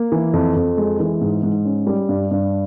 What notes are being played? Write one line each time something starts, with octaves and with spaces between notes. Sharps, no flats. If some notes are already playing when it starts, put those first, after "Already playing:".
Already playing: A#3
E3
F2
F2
G#3
E3
G#2
G#2
C#4
G3
G2
G2